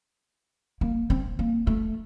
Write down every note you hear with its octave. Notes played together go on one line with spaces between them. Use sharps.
A#3
C4
A#3
A3